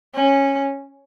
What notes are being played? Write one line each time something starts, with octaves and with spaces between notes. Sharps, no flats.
C#4